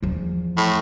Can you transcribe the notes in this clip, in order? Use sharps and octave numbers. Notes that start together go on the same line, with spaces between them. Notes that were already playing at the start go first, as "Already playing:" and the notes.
E2 F3
A2